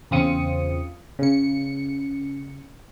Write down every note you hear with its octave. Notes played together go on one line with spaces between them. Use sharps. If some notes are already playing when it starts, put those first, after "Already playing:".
E2 C#3 C4 F4 D#6 C#7
C#3 C#7